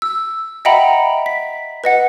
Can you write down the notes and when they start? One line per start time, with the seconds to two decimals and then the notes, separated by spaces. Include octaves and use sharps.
0.02 E6
0.65 D#5 E5 F#5 G5 A#5 B5
1.26 B6
1.84 B4 D#5 F#5